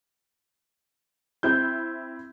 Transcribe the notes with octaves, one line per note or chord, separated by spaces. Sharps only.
C4 E4 G6